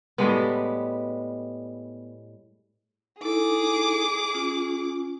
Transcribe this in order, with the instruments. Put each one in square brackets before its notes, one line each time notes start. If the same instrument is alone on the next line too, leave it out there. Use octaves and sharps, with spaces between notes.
[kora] A2 G3 G#3 B3
[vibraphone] D#4 E4 A4 [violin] G#4 D6
[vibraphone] C#4 F4